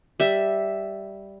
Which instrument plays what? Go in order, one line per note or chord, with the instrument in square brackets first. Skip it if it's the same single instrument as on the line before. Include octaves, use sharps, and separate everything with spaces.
[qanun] G3 E5